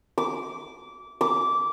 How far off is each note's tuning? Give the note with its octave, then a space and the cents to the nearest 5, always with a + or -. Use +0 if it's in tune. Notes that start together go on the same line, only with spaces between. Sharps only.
D6 -20
D6 -15